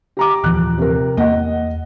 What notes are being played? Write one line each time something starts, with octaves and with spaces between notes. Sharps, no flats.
G4 A#5 D6
D#1 E3 F3 F#6
C3 A#4
E2 A#3 D#5 F#5